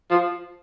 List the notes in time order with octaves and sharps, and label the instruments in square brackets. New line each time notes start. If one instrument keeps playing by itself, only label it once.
[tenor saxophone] F3